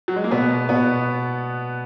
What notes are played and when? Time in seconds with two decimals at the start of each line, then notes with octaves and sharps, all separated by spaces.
0.08 F#3
0.16 G#3
0.24 A#3
0.31 B2 B3
0.69 B2 B3